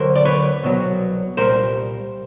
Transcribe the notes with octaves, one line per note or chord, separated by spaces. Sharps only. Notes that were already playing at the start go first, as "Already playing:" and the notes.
Already playing: D2 D3 F#3 A#4 C5
D5
B4 C#5
C2 B2 F#3
C2 A#2 G3 A#4 C5